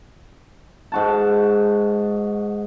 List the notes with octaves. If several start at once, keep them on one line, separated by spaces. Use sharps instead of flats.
G#2 F#4 A5